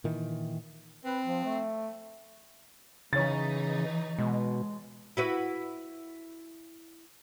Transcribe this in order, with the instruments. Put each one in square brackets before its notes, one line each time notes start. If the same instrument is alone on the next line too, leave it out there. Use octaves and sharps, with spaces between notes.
[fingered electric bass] A#2 D#3 E3
[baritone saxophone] C4 [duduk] B4
[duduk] F3
A3
[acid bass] C#3 [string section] E3 D#4 [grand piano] C#5 A6
[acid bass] B2 [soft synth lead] G#3
[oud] E4 F#4 B4